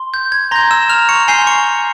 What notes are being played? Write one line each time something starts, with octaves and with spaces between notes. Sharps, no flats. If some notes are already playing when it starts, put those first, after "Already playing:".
Already playing: C6
G6
G#6
A#5 C6 G6 A#6
E6 E7
F6 F7
C#6 C#7
G#5 C6 E6 G6 C7
C#6 C#7